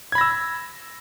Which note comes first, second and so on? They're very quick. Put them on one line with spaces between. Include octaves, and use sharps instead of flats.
G#6 B5 A#6 E6